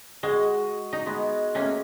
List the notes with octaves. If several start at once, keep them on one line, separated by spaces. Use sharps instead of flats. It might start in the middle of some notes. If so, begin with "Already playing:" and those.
G#3 F#4 D#5
D#4
G#3 B3
A3 A#3 C#4